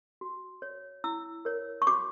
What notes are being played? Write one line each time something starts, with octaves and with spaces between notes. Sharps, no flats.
F#4
C#5
E4 E6
A#4 C#5
C#6
F#4 D6